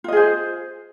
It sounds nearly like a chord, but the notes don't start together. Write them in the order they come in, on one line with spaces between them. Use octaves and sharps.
F4 D#5 G#4 C5